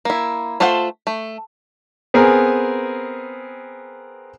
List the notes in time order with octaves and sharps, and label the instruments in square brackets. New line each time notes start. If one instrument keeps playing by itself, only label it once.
[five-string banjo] A#3 E4
A3 F4 A4 C5 F#5
A3
[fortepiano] B3 C4 G#4 A#4 G#5